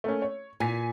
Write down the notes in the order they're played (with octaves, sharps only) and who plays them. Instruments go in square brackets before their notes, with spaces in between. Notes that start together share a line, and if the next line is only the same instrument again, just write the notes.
[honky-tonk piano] A3 A#3 C#4
C#5
[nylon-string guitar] A#2 [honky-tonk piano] G#5 B6